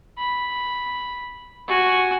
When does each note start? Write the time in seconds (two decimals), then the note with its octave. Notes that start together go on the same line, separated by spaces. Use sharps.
0.18 B5
1.68 F#4 G#5